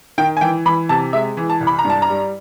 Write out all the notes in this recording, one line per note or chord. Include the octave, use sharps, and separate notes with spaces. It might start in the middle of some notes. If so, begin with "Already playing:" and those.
D#3 G5
G#5
E3 G5
E3 B5
C3 A5
G#3 E5
E3
A5
C2
B5
A#5
G2
A5
A#5
G3